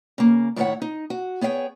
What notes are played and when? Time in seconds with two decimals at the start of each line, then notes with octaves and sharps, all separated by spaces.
0.18 C#3 A#3
0.56 A2 D#3 E4 A#4 C#5 F#5
0.82 D#4
1.10 F#4
1.41 B3 G#4 C#5 F5 G5